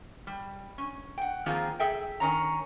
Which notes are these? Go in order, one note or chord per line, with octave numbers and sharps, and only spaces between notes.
G3
C#4
F#5 G5
D#3 F3 A#3 C4 F4 G#4
G#4 A4 E5 G5
D#3 C#4 A#5